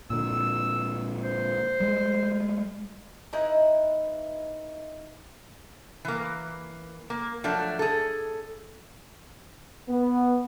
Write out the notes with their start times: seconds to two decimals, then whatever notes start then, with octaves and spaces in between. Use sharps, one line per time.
0.10 A#2 D3 E6
1.24 C5
1.80 G3 G#3
3.33 D#4 E4 B4 D#5
6.05 E3 A#3
7.10 A#3
7.44 F3 F#3 A3 D4
7.79 G#4 A4
9.88 B3